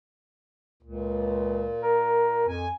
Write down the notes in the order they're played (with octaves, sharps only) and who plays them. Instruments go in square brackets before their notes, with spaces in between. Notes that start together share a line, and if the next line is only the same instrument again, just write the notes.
[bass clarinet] C#2 [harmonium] A#2
[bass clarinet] A#4
[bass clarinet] F2 [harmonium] G#5